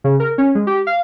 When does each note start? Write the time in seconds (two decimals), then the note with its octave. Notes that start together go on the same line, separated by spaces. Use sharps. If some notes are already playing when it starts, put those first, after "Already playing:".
0.04 C#3
0.20 A#4
0.38 C#4
0.55 G#3
0.67 G4
0.87 F5